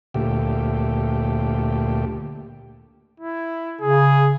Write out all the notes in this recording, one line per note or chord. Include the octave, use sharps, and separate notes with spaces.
D2 A#2 A3 G4
E4
C#3 G#4